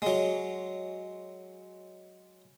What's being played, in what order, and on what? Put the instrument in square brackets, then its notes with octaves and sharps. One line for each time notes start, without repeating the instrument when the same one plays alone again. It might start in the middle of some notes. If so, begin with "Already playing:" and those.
[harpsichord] F#3 G#3